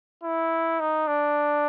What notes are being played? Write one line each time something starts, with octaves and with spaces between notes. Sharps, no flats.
E4
D#4
D4